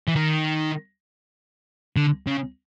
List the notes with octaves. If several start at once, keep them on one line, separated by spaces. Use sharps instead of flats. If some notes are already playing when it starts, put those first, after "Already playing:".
E3
D#3
D3
C#3